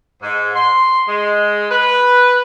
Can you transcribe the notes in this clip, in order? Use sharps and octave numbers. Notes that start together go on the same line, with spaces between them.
G#2
C6
G#3
B4